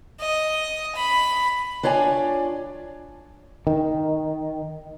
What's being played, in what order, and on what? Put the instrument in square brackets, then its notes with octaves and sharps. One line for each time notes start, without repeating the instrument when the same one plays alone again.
[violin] D#5
B5
[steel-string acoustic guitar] D4 F4 C#5 D5 G5 G#5
[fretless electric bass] D#3